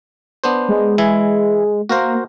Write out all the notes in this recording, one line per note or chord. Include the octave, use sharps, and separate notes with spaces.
B3 D4 C5
G#3
E3 E4 G#5
A#3 F#4 A#4 C5